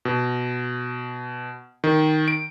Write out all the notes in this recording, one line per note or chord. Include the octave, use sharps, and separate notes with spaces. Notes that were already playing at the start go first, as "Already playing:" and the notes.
B2
D#3
D7